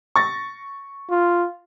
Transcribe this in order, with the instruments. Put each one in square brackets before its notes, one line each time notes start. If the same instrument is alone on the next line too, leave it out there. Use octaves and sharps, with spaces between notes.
[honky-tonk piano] C#6 A6 A#6
[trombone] F4